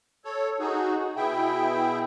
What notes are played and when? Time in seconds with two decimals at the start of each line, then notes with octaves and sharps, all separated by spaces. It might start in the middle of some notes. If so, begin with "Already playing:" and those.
0.25 A4 C#5
0.60 D#4 F#4 G#4
1.16 B2 E4 G#4 E5 G5